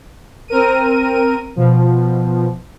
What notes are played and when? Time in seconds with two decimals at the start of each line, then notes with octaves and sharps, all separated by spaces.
0.48 C4 A#4 D#7
1.56 B2 F3